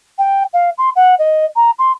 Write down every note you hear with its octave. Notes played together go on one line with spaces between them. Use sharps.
G5
F5
C6
F#5
D#5
A#5
C6